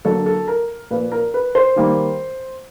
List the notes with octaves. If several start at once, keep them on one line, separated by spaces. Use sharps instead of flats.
D3 F#3 A#3 A4
A4
A#4
A#2 F3 A#3 B4
A#4
B4
C5
D#3 G3 A#3